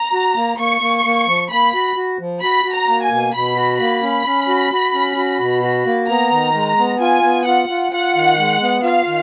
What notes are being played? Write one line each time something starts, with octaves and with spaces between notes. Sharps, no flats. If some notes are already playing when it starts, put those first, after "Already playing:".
Already playing: A#5
F#4
A#3
A#3 C#6
A#3
A#3
F3
A#3 B5
F#4
F#4
F3
F#4 B5
F#4
A#5
A#3
G#5
B2
B2 B5
F#4
A#3 B5
C#4
C#4
F#4
F#4
C#4
F#4
B2
F#4
A#3
B3 A#5
D#3
G#3
B3
F4 G#5
B3
F4 F#5
F4
F4 F#5
D#3
G#3
B3
F4 F5
D#3